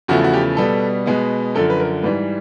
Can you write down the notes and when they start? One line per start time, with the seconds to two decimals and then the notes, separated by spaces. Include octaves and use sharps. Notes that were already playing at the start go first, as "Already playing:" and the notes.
0.08 E2 C#3 F3 A3 F#4
0.24 F#4
0.34 G4
0.57 B2 G3 B3 A4
1.06 B2 G#3 B3
1.55 F#2 D3 F3 A4
1.70 B4
1.80 A#4
2.03 G#2 E3 G3 B4